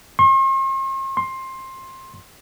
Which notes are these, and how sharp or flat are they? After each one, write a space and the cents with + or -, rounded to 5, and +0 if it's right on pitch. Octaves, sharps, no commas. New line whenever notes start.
C6 +45
C6 +15